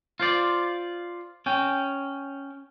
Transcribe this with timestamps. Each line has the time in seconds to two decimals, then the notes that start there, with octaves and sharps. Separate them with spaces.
0.20 F4 C5 D5
1.46 C#4 G5